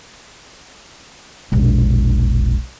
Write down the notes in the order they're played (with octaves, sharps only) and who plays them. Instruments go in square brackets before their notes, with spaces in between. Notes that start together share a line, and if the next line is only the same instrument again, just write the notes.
[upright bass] E1 A#1